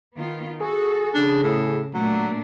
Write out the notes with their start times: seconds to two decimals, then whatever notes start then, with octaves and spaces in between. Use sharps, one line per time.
0.17 D#3 B3 F4
0.60 F#4 G#4 A4
1.14 C#3 D4
1.43 A2
1.94 A#2 F#3 A3 D4